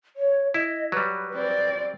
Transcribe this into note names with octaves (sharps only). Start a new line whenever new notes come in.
C#5
E4 D#5
F#3 G3 B4
C4 D5